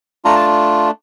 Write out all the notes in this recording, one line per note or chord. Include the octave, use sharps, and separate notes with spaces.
A3 D4 F4 A#5
A5